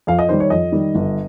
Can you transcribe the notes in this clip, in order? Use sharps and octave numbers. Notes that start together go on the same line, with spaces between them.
F2 F5
D#5
D#3 G3 C5
C#5
F2 D#5
D#3 G3
G1